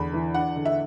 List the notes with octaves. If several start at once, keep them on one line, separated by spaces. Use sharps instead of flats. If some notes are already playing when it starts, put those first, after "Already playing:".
Already playing: E2 D3 B5
E3
D4 F#5
D3
E5